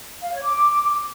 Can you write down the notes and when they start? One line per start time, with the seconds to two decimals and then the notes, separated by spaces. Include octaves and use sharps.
0.20 F5
0.31 C#5
0.43 D6